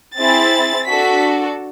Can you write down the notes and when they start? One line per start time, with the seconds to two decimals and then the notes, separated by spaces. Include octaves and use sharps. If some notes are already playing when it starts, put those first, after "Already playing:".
0.17 C4 E4 G#4 A6
0.89 D4 F#4 A4 B6